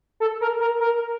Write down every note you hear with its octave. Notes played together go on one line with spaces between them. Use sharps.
A4
A#4
A#4
A#4